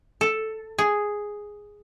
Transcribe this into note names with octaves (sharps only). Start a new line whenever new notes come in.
A4
G#4